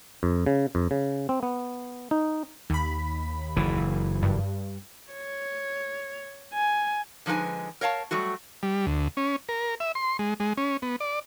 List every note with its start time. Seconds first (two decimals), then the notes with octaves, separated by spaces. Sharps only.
0.23 F2
0.46 C#3
0.75 F2
0.91 C#3
1.29 C4
1.43 B3
2.11 D#4
2.70 D#2 B5
3.57 F#1 E3
4.22 G2
5.13 C#5
6.54 G#5
7.26 D3 F3 G#3 D#4 B4 G#5
7.81 A#4 C#5 F5 G#5 A5
8.11 F#3 G3 A3 F#4
8.63 G3
8.87 D2
9.17 C#4
9.49 A#4
9.80 E5
9.95 C6
10.19 G#3
10.40 G#3
10.58 C#4
10.82 B3
11.00 D5